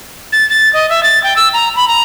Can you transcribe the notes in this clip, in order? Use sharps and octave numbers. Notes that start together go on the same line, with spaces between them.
A6
A6
D#5
E5
A6
G5
E6
A#5
B5
A#5